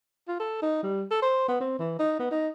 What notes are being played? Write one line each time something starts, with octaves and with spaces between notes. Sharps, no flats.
F4
A4
D#4
G3
A4
C5
B3
C4
E3
D#4
B3
D#4